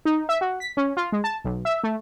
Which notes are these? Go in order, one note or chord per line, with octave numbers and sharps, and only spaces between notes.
D#4
E5
F#4
B6
C#4
F4
G#3
A5
B1
E5
A3